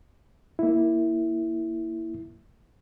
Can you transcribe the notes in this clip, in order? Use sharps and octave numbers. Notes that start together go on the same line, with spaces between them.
A#3 E4